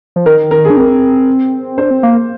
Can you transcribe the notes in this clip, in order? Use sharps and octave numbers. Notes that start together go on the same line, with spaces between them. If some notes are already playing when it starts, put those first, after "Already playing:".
F3
D#3 A#4
A#4
G#4
D4
C4 A#4
D4 C5
C4
A#3